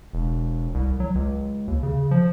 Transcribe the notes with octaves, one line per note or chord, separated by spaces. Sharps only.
E1
C2
F#3
C#2
D#2
C#3
F3